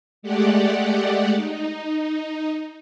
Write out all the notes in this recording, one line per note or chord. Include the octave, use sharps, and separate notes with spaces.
G#3 A3 G4 D5 F#5
D#4